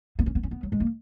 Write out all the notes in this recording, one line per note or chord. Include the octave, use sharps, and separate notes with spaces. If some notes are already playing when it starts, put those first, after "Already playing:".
B3
C#4
B3
C#4
B3
F#3
G#3
A#3